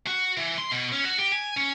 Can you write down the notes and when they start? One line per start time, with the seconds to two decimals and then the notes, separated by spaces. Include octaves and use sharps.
0.07 F#4
0.37 E3
0.58 C6
0.71 B2
0.92 C#4
1.04 F#4
1.19 G4
1.32 G#5
1.57 C#4